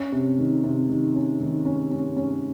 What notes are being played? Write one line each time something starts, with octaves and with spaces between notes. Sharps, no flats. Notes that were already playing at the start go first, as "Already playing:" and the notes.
Already playing: C#4
C3
D#3
C3
D#3
C#4
D#3
C#4
C#4
C#4